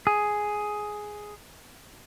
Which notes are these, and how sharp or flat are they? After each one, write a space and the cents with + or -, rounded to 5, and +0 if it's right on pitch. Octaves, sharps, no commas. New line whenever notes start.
G#4 +5